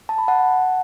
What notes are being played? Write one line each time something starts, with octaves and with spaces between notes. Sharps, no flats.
A5
B5
F#5 A5